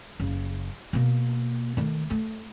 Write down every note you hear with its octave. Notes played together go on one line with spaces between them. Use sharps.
F#1 C#3
B2 A#3
D#3 A3
A3